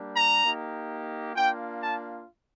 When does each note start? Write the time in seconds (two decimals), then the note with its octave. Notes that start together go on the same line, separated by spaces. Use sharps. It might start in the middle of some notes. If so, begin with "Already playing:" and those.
Already playing: G3 A#3 D4 G4
0.15 A#5
0.45 A#3 D#4 G4
1.35 A#3 D4 F4 G5
1.81 A5